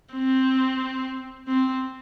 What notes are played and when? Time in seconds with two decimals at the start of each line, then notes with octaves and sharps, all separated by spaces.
0.14 C4
1.48 C4